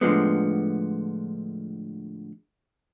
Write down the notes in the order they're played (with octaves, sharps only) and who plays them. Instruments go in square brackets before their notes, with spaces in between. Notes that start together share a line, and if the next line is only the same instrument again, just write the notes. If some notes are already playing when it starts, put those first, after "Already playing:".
[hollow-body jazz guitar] A2 D3 E3 F3 G#3 B3